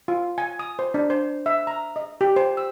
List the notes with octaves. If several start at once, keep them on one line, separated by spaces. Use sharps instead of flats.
F4
G#5
D#6
C5
D4
C5
E5
A#5
D#5
G4
C5
E6